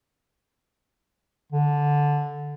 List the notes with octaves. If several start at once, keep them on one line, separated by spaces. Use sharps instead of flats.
D3